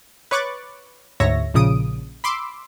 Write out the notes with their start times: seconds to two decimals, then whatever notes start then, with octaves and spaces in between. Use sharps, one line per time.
0.31 B4 C#5 C#6 D6 F#6 A6
1.20 D2 G#2 C#5 E5 A#6
1.54 A#1 A#2 C#3 D#6 D7
2.24 B5 C6 D6 E6